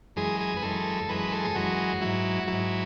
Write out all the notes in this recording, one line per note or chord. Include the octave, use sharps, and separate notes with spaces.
F#2 E3 G#3 G#4
G#4
B4
F#2 E3 G#3 A4
F#2 E3 G#3 B4
A4
G#4
F#2 E3 G#3 F#4
G#2 F#3 E4
F#4
G#2 F#3 E4